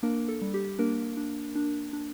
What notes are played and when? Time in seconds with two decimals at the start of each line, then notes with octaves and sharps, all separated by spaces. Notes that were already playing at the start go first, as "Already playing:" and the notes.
0.03 A#3 D4 A#4
0.28 A4
0.41 G3
0.54 G4
0.79 A#3 D4 A#4
1.17 D4
1.55 D4
1.93 D4